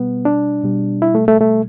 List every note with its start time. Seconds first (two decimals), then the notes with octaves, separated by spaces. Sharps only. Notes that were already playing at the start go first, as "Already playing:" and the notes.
Already playing: B2 G3 B3
0.25 D4
0.64 B2 G3
1.02 E4
1.15 A3
1.28 A3
1.41 A3